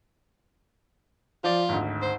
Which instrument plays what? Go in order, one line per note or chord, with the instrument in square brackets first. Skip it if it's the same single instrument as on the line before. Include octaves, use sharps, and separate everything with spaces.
[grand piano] F3 D5 [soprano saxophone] F4
[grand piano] G#1 D2
[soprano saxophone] C5